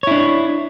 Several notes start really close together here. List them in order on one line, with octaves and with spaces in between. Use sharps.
C#5 E4 D4